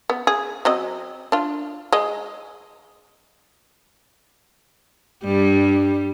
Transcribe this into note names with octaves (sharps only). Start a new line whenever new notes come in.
B3
G#4
F#3 C4 D#5
D4 F4
G#3 D#5
G2 G3